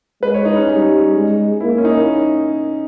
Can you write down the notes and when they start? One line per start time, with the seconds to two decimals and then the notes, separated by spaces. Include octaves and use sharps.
0.22 G#3 B4
0.34 C#5
0.45 D#4
0.57 C#4
0.69 G3 D#4
1.15 G#3
1.61 A#3 E4
1.78 C#4
1.85 D#4